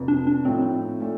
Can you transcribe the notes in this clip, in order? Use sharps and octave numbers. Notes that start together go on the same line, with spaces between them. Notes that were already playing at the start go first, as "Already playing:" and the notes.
Already playing: F1 F2 C3
D4
D4
A2 F3 A3 C4 D#4
A#2 A3